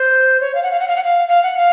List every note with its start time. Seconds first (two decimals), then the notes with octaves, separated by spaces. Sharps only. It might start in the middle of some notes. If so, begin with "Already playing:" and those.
Already playing: C5
0.40 C#5
0.55 F5
0.63 F#5
0.71 F5
0.80 F#5
0.88 F5
0.96 F#5
1.04 F5
1.28 F5
1.43 F#5
1.57 F5